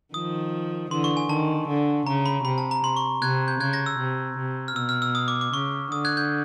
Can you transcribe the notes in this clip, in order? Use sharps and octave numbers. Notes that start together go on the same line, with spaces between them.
D#3 F3 D#6
D3 E3 C6
C#6
G#5
D#3 A5
D3
C#3 A#5
B5
C3 B5
A5
A#5
C6
C#6
C3 F#6 G#6
G6
C#3 F#6 G#6
G#6 A#6
E6
C3
C3
F6
B2 E6
F6
E6
D#6
D6
D6
C#3 C#6
D3 D#6
F#6 G#6
G6